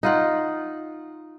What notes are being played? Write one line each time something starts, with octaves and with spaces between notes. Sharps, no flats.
D#4 F4 F#5